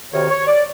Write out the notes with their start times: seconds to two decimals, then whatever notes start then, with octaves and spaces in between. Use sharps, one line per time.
0.12 D2 C3 D#3 C#5
0.29 C#5
0.47 D5